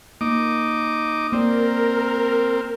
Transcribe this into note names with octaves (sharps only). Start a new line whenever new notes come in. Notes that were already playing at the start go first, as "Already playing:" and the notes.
A#3 D#4 D6
A#3 C4 A#4 D5